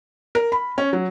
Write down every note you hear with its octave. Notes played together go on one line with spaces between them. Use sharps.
A#4
B5
C#4
F#3